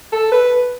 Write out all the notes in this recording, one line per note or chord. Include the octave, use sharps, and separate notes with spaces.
A4
B4